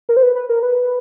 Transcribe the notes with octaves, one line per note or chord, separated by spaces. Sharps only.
A#4
C5
B4
B4
A#4
B4